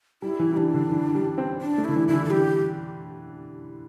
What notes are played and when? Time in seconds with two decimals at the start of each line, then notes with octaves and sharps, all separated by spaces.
0.22 G3 E4
0.39 E3
0.53 G3
0.57 E3 D4
0.74 D3
0.91 E3
1.15 G3
1.38 C4
1.61 D4
1.78 A3
1.84 D3 E4
1.96 E3
2.08 D3 E4
2.13 E3
2.25 A4
2.30 G3 G4